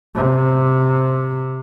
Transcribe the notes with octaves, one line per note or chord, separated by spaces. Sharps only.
C3